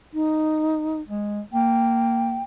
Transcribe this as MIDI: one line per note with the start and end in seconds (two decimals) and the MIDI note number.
0.13 1.01 63
1.08 1.40 56
1.53 2.41 58
1.53 2.43 79